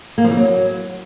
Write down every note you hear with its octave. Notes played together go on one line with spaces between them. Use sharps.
A#3
F3
E3
F#3